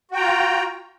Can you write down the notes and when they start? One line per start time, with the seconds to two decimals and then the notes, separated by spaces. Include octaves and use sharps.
0.11 F#4
0.14 G5
0.17 A#5
0.20 F4